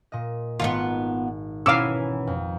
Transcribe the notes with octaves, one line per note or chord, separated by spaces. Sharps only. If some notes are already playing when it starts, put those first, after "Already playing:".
A#2 D#5
G#1 B3 D#4 F4
B2 E3 C#4 F5 A#5 D6 E6 D#7
F2